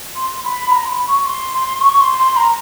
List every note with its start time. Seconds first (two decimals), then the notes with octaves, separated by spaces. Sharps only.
0.15 C6
0.43 B5
0.71 A#5
0.85 C6
0.89 B5
1.07 C#6
1.25 C6
1.54 C6
1.81 C#6
2.00 C6
2.18 C6
2.36 A#5